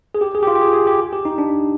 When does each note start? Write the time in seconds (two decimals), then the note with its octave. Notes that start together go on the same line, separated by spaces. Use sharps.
0.15 G#4
0.21 G4
0.35 G#4
0.43 G4
0.47 F4
0.55 G4
0.61 G#4
0.73 G#4
0.87 G4
1.13 G4
1.25 D#4
1.38 D4